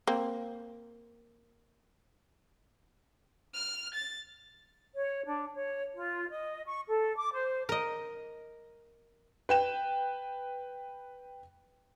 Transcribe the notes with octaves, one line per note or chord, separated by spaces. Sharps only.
A#3 C4
F6
A6
C#5
D4
C#5
F4
D#5
C#6
A4
D6
C5
A#4 D#5
B4 G5 E7